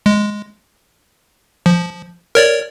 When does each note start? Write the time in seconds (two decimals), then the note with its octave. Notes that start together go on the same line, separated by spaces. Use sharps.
0.06 G#3
1.66 F3
2.35 A#4 C#5 D5